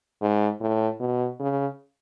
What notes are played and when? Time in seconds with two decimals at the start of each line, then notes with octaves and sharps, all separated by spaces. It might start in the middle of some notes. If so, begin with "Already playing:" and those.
0.21 G#2
0.60 A2
1.00 B2
1.40 C#3